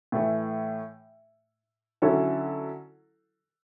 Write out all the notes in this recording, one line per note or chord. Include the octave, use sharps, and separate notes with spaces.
A2 E3 A3
D3 F#3 C#4 E4 A4